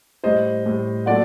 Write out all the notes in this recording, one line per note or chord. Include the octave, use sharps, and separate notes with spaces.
A2 G3 C5 D#5
A2 G3
A#2 F#3 A3 D5 F#5